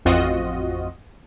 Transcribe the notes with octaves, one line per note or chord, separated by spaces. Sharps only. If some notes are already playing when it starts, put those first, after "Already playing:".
A1 F2 C4 F4 F#4 D#5